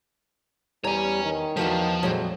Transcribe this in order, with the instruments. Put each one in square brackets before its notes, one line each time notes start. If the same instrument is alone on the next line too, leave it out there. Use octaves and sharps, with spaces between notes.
[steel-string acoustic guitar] E2 A#5 [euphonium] G3 [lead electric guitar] C#5 G#5
[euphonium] D#3
[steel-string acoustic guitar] E2 F#4 F5 [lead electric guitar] F3
[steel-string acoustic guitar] F2 A#2 F#3 [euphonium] G#3